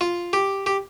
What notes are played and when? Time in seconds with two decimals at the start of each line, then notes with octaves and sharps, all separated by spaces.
0.01 F4
0.33 G4
0.66 G4